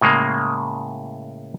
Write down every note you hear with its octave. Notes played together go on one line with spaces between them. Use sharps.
A2 C#3 G#3 A#3